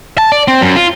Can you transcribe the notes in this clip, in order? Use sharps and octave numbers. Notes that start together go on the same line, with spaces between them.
A5
D5
C4
F#2
F4